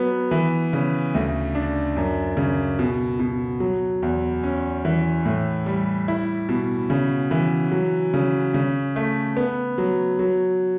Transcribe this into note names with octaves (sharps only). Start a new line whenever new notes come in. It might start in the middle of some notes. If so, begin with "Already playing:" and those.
Already playing: F#3 B3
E3
C#3
D2
D4
F#2
C#3
B2
B2
F#3
E2
C#4
E3
A2
G3
E4
B2
C#3
E3
F#3
C#3
C#3
A3
B3
F#3
F#3